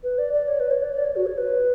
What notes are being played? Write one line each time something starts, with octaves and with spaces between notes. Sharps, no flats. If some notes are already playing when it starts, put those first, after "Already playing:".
B4
D5
D5
C#5
B4
C#5
D5
D5
C#5
F#4
C#5
B4